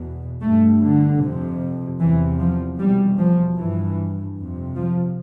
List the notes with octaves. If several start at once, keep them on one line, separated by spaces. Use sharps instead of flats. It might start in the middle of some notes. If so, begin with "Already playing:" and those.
Already playing: E2 B2
G2 A3
D3
F2 C3
E2 C3 E3
F3
E2 B2 G3
F3
G2 E3
F2 C3
F3